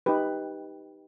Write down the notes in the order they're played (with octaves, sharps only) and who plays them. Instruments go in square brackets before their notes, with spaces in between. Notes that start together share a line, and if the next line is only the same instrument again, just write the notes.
[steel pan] D#4 G4 B4